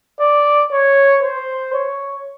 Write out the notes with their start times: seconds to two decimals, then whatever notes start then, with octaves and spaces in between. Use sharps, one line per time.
0.20 D5
0.71 C#5
1.23 C5
1.73 C#5